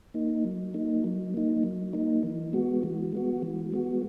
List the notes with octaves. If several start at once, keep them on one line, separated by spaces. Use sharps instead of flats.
A#3 D#4
F#3
A#3 D#4
F#3
A#3 D#4
F#3
A#3 D#4
E3
G#3 B3 F#4
E3
G#3 B3 F#4
E3
G#3 B3 F#4